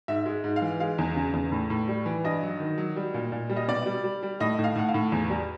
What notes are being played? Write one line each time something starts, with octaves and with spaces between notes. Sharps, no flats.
G#2 E5
G#3
G#2
F5
E3
G#3 F5
E2
C#3
E2
A2
A2
G3
E3
G2 D#5
F#3
D#3
F#3
G3
A#2
A#2
G3
D#5
B2 D5
G3
G3
G3
A2 D#5
A2
F5
A2 F#5
F5
A2
E2
G3